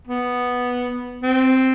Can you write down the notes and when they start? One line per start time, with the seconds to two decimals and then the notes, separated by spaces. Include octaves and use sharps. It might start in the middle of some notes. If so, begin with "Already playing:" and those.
0.07 B3
1.23 C4